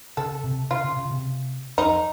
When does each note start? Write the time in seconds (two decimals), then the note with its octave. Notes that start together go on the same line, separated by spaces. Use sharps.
0.17 C#3 A4
0.44 C3
0.71 C#3 F4
0.84 C#3
0.97 C#3
1.11 C3
1.78 F2 D#4